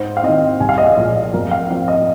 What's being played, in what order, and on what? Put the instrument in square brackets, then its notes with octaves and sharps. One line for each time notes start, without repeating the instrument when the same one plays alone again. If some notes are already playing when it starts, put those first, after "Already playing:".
Already playing: [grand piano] G#2 C5
F5
D#3 C4 D#5
C2 G#5
F5
D#5
F5
A#2 F3 G#3 D#5
F2 A#4
F5
F3 C4 F5
D#5